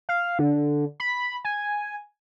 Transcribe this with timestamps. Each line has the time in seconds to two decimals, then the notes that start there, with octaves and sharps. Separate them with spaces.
0.09 F5
0.39 D3
1.00 B5
1.45 G#5